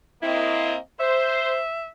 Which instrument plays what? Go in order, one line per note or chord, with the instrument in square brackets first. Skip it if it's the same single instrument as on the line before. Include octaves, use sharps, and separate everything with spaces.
[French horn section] A#3 C4 D#5 [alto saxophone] E4
[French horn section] C5 [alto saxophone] E5